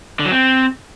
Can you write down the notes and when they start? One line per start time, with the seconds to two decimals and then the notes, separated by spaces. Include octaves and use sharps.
0.19 D3
0.25 F#3
0.31 C4